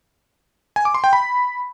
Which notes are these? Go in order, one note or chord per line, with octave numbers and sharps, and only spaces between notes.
G#5
D6
C6
G5
B5